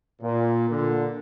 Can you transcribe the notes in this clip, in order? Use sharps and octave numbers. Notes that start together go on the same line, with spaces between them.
A#2
A#2 D3